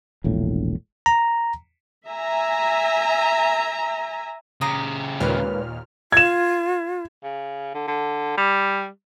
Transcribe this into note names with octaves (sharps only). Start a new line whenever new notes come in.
E1 A#1 A2
A#5
E5 G#5 A#5
C#3 G4 A#5 D#6
D#2 A#2 G#3 B4 C#5 F6
F4 G#6 E7
C#3
D3
D3
G3